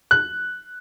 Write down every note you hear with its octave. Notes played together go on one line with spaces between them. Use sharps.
F#6